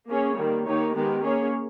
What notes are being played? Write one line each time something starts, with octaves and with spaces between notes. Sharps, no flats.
A#3 C#4 G#4 C#5
D#3 G3 A#3
D#3 A#3 D#4 G4 C#5
D#3 G#3 B3 G4 A#4
A#3 C#4 G#4 C#5